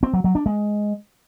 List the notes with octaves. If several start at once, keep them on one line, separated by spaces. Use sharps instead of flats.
C4
F#3
F#3
D4
G#3